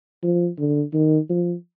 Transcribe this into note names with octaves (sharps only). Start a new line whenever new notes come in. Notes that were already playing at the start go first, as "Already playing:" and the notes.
F3
D3
D#3
F3